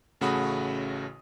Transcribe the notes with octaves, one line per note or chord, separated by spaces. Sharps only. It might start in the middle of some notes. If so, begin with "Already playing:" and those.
A1 C#3 A3 F#4 B5 D#6